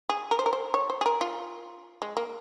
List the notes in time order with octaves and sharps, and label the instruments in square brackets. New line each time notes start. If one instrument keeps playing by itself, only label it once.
[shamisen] G#4
A#4
C5
A#4
C5
C#5
C5
G#4
A#4
F4
G#3
A#3